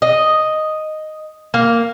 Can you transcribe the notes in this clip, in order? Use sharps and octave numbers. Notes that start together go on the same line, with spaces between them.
D#5
A#3